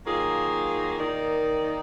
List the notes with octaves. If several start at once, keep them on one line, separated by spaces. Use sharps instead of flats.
D#3 F#3 A#3 F4 G#4
D#3 A#3 D#4 A#4 D5